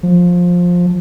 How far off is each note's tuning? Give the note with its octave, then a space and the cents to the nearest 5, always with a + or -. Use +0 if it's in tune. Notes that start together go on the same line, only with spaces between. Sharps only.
F3 +15